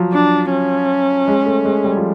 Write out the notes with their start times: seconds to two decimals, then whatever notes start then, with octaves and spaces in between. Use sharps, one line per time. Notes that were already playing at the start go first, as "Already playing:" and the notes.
Already playing: F3 F#3
0.13 D4
0.51 C#4
1.28 G#3
1.46 A3
1.65 G#3
1.84 G3
1.97 F3